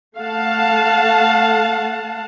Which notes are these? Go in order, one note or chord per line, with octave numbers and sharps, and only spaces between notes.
A3 F5 F#5 A5